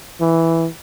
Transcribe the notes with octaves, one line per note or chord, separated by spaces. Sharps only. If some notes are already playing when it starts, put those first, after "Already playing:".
E3